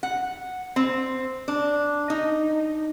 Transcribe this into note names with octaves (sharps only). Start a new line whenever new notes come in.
F#5
C4
D4
D#4